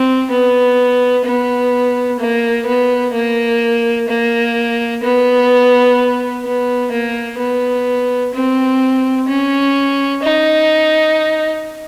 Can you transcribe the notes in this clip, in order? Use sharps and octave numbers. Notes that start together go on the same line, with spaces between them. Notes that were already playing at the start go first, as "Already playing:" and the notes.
Already playing: C4
B3
B3
A#3
B3
A#3
A#3
B3
B3
A#3
B3
C4
C#4
D#4